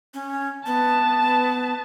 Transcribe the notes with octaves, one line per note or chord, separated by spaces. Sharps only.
C#4
B3 A5